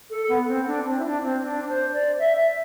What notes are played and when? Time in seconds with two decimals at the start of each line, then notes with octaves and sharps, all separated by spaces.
0.10 A4
0.29 B3
0.48 C4
0.67 D4
0.86 C4
0.99 E4
1.05 D4
1.23 C4
1.43 D4
1.69 C5
1.93 D5
2.19 E5
2.37 E5